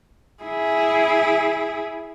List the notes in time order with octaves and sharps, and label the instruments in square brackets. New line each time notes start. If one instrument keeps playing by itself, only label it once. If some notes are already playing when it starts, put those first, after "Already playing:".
[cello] E4 G#4